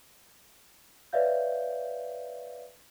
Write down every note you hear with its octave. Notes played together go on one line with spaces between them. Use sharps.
B4 C#5 D5 E5 F5 G6